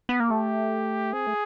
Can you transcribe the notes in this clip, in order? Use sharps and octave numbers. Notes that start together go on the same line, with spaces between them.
B3
A#3
A3 G4
C4 G#4
A3